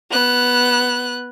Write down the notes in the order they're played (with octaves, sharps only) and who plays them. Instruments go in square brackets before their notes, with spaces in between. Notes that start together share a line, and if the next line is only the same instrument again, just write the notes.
[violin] B3 F#6